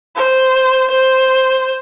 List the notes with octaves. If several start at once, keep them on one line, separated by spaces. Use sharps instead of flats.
C5
C5